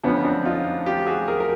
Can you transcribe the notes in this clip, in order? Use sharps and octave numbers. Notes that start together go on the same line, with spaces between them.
F2 D3 F3 B3 C#4
C4 D4
D#4 F4
F4 G4
F#4 G#4
G#4 A#4
A#4